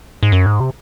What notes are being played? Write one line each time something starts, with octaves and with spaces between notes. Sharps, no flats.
G#2
F#2
G#2
C3